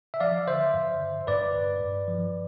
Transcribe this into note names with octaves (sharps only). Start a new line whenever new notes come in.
E5
F3 D5 F5
D3 C5 E5
G2
D3
G2 B4 D5
G2
G2
F3